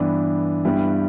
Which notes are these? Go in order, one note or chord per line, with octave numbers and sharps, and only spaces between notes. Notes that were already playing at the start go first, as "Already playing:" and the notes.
Already playing: G2 E3 B3 D4
G2 G3 B3 E4